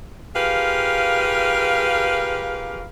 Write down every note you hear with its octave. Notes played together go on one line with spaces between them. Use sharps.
F4 G4 G#4 A#4 B4 F5